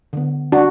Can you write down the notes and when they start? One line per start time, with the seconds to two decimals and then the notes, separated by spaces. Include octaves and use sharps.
0.13 D3 B3
0.52 D4 F#4